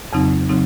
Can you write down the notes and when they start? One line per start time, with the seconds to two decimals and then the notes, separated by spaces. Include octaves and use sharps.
0.13 F2 C#3 F#3 C4 D#4
0.49 C#3 F#3 C4 D#4